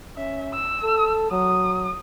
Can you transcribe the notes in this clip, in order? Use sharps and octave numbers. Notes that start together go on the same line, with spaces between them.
C#4 E5
E6
A4
F#3 D#6